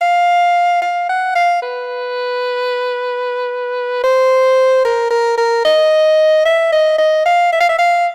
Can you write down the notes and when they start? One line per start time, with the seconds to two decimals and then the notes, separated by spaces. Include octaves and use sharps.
0.01 F5
0.82 F5
1.09 F#5
1.35 F5
1.62 B4
4.04 C5
4.85 A#4
5.10 A#4
5.38 A#4
5.65 D#5
6.45 E5
6.72 D#5
6.98 D#5
7.26 F5
7.53 E5
7.60 F5
7.69 E5
7.79 F5